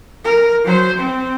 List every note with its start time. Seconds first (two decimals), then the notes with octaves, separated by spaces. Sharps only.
0.24 A#4
0.64 F#3 C5
0.97 C4